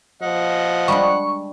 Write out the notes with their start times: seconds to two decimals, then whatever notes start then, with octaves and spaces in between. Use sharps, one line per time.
0.22 F3 D#5 F#5
0.88 G3 G#3 D4 C#6